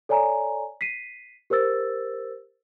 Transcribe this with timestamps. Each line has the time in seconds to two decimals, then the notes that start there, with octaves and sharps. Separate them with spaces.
0.09 A4 C#5 D5 G#5 A#5
0.81 B6 C7 D#7
1.50 G4 A#4 C5 E6 A6